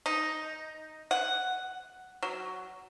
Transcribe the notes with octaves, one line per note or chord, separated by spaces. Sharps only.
D#4
F#5
F#3